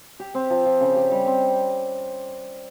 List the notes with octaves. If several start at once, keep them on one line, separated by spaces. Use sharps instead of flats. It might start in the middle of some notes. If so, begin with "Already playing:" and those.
G4
C4
F3
F3
C#3
G4
G3
C4